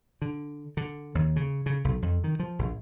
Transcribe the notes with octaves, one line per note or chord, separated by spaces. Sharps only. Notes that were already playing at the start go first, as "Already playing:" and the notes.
D3
D3
D#2
C#3
C#3
B1
F2
D#3
F3
A#1